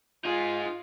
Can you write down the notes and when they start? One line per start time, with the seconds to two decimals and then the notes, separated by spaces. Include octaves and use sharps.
0.25 D#4 F4 G#4